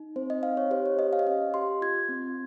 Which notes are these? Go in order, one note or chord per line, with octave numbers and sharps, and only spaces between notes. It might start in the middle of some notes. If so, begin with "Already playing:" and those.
Already playing: D#4
C4 C5
D#5
D#4 F5
C#5
G4 C5
C#5
G4 D#5
F5
D#5
C#4 F5
G4 C6
F4 G#6
C4